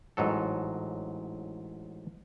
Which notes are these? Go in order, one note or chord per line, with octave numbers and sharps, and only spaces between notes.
A1 G#2 F#3 A4